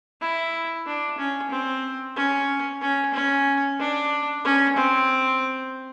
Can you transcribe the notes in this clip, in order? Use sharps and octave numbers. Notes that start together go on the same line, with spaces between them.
E4
D4
C#4
C4
C#4
C#4
C#4
D4
C#4
C4